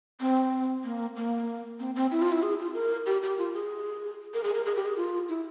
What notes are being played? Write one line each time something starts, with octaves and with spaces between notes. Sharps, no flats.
C4
A#3
A#3
C4
C4
E4
F4
E4
G#4
F4
A#4
G4
G4
F4
G#4
A#4
G#4
A#4
G#4
G4
G#4
F4
E4